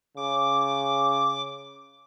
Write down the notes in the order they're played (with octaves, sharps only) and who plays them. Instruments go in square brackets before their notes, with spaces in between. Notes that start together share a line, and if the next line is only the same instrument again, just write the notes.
[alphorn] C#3 [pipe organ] D6